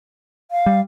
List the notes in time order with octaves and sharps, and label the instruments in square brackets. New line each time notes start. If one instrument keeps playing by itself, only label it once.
[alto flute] F5
[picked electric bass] G3